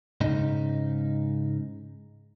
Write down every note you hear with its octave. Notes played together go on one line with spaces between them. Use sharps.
G#2 C#3 D#4